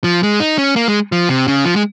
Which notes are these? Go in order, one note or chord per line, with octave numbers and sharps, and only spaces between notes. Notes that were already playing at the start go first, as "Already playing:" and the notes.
F3
G#3
D#4
C#4
A#3
G#3
F3
C3
C#3
F3
G#3